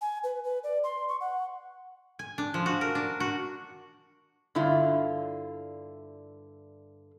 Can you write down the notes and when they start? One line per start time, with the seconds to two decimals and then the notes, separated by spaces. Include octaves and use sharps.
0.01 G#5
0.24 B4
0.44 B4
0.64 D5
0.84 C6
1.08 C#6
1.21 F#5
2.19 G#5
2.38 D4
2.54 F3
2.66 F#4
2.81 A#4
2.95 D4
3.20 F#4
4.55 G2 D3 E4 F4